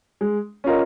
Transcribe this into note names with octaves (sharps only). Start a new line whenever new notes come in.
G#3
C#4 F4 A#4 D#5